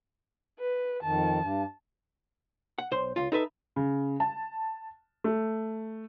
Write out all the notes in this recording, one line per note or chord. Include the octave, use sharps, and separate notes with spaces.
B4
F2 D#3 A5
G2
F#5
B1 C5 C6
C#2 F4
D#4 A4 B4 E5
C#3
A5
A3